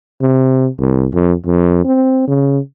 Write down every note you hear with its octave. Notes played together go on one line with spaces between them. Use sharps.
C3
C2
F2
F2
C4
C#3